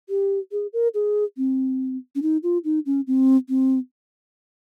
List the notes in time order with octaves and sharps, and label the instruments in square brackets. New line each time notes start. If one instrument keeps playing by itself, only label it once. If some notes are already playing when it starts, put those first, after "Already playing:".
[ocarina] G4
G#4
A#4
G#4
C4
C#4
D#4
F4
D#4
C#4
C4
C4